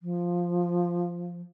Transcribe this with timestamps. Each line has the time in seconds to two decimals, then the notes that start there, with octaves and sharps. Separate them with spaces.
0.01 F3